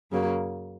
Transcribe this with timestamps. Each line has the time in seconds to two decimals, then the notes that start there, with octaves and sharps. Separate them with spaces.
0.11 F#2 C#3 F#3 A#3